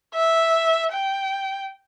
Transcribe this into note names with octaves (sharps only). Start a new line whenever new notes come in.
E5
G5